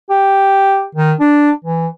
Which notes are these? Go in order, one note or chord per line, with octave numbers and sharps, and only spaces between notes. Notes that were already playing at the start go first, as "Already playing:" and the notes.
G4
D#3
D4
E3